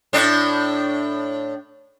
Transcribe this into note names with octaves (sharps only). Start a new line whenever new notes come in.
A2 D4